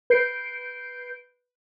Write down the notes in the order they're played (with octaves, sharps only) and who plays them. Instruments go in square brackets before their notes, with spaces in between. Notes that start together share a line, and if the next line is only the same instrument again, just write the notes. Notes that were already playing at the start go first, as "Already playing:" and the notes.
[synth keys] B4 G6 C7 D7